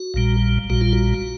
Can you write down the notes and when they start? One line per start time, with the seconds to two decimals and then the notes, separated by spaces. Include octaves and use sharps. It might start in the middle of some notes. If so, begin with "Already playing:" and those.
Already playing: F#4
0.14 A#1 A#2 G3
0.70 A#1 A#2 G3 F#4
0.81 F4
0.93 F#4